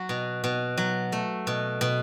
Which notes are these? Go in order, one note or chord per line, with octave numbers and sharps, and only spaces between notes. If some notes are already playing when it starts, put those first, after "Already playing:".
Already playing: F#3 F#4
B2
B2
F#3
A3
B2
B2